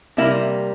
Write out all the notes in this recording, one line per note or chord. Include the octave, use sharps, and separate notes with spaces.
C3 G3 A#3 E4